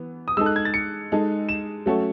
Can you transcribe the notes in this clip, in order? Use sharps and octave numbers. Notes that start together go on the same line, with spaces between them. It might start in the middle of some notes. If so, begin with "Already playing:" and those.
Already playing: E3 B3
D#6
G#3 D#4 A4 E6
F#6
G#6
A6
C#7
G#3 D#4 A4
E7
F#3 A3 C#4 F#4 A4